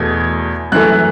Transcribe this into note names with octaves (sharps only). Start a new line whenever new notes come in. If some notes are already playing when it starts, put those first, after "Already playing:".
Already playing: E2 B2 A3 G#6
F#2 E3 A3 F#6